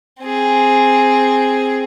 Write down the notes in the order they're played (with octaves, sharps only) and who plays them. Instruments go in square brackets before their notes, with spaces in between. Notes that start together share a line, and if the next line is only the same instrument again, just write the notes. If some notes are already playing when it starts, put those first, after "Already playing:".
[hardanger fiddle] C4 G#4